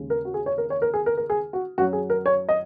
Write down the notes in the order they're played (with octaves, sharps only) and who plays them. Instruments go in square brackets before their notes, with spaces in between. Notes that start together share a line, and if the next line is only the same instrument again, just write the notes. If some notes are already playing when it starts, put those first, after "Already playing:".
Already playing: [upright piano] D#2 C#3 G#3
A#4
F#4
G#4
C#5
A#4
C#5
A#4
G#4
A#4
A#4
G#4
F#4
F#2 F#3 F#4
G#4
A#4
C#5
D#5